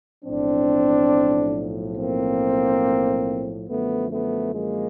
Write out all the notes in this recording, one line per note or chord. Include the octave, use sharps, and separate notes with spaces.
B1 A2 F3 C4 D4
A#3 C4
F#2 D3 F3 A3 B3
A3 B3
G#3 A#3